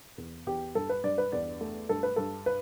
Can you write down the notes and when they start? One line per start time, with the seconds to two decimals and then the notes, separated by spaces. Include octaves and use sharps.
0.18 E2
0.47 E2 G4
0.75 G2 A4
0.89 B4
1.04 G2 D5
1.18 B4
1.32 E2 D5
1.61 A3
1.89 G2 A4
2.03 B4
2.16 G2 A4
2.46 B4